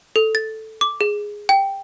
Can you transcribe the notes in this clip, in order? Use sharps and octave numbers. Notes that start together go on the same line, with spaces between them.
A4
A6
D6
G#4
G5